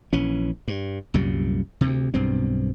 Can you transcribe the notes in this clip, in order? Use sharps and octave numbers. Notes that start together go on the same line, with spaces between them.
A#1 E3 C#4
G2
C2 F#2 A#2 G3
D2 C3
B1 G2 B2 C4